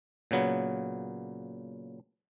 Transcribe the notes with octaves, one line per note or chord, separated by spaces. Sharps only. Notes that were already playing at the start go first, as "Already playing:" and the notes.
A#2 C#3 F#3 B3